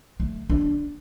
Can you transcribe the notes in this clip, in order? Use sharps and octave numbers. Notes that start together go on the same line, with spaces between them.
A3
D4